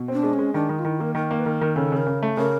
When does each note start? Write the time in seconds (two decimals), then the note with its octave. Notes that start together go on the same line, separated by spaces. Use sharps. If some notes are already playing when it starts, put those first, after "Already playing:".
Already playing: B2
0.08 C4 D4
0.23 G#3
0.33 C#4
0.39 G#3
0.54 D#3 D4
0.69 D#3 D#4
0.79 F4
0.85 D#3 E4
1.00 A#3 A#4
1.15 D#3 A#4
1.31 A#3
1.39 B4
1.45 D#3 A#4
1.61 D#3
1.76 C#3 A4
1.92 C#3 A#4
2.07 C#3
2.23 A3
2.37 C#3 A#4